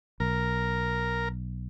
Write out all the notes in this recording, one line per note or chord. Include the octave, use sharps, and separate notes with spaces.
B1 A#4